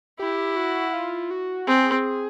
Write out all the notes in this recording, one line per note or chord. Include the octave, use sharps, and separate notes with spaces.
E4 G4
F#4
F4
F#4
C4 G#4